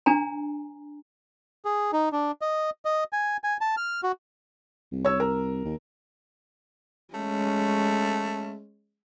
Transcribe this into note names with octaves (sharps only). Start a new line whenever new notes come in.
D4 G#5 A#5
G#4
D#4
D4
D#5
D#5
G#5
G#5
A5
F6
F#4
C2
C#5 E6
A#4
D#2
G#3 A3 C#4